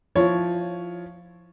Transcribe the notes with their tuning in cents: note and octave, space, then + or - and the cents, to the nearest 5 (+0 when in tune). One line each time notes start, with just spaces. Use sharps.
F3 +0 E4 +0 C#5 +0